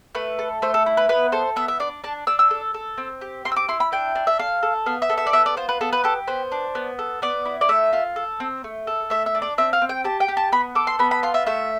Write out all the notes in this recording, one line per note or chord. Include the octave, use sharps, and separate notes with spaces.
A3 B4
A4
A3 C5
A4
E4
B4
B3 B4
A4 C5
B3 E5
E5
D4 D5
D4 A5
D4 E6
E6
A4
A4
C4
G4
C4 C6
E6
D6
E4 C6
B5
D4 G5
D4
E5
A4 F5
A4
B3 F5
E5
A4
E5
D5
B3 E5
D5
F4 C5
B4
B3 A4
B4
G4 A4
B3 C5
D4
B3
A4
B3 D5
E4
D5
A3 E5
F4
A4
C4
A3
A4
A3 E5
E5
D4
D5
C4 E5
F5
C4
G5
G4 A5
G5
G4
A5
B3 B5
A4 D6
C6
B3 B5
B5
F4 C6
E5
A3 E5